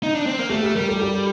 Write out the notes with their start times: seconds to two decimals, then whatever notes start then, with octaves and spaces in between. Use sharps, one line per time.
0.03 D#4
0.15 D4
0.26 C4
0.39 A#3
0.49 A3 G4
0.63 G4
0.75 G3 A#4
0.89 A4
1.01 G4